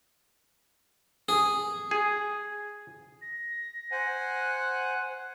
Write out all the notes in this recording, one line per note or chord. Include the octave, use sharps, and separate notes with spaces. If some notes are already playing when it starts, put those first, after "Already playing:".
G#4
G#4
A#6
C5 F#5 G#5
F#6